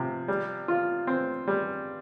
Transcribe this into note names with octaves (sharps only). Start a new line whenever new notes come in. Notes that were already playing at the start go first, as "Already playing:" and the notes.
Already playing: C3 F3
G3
F4
C4
G3